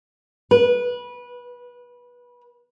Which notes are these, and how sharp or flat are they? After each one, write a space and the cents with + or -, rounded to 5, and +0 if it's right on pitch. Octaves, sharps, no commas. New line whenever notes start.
B4 -20